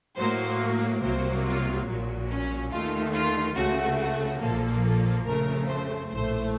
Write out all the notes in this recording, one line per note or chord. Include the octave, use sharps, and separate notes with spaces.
A2 F#3 A#3 C5
C2 C3 F#3 A#3 C5
F4
A#1 A#2 F#3
C#4
D#2 D#3 A3 F4
F4
C#2 C#3 A3 F#4
F#4
A#1 A#2 F3 A#3 A4
A4
F2 C#3 A3 A#4
C5
A#1 A2 A3 C5